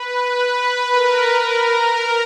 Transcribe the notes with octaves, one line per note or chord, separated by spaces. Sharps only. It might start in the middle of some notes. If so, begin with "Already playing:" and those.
Already playing: B4
B4
A#4
A#4